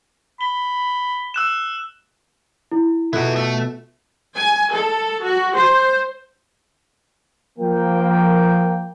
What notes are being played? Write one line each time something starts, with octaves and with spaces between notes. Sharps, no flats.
B5 G7
E6 F#6 E7
E4
B2 B3 E4 F4 A4 F#6
A3
G#5
A4
F#4
C5
F3 A#3 G5